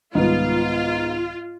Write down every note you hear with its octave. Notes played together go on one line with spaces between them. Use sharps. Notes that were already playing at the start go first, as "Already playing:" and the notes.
C2 G#2 D#3 G3 B3 F4